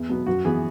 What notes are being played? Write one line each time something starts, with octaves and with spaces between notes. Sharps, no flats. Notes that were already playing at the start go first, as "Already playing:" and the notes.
Already playing: E2
B2 F#3 B3
F#2 F#4
E3 B3 G#4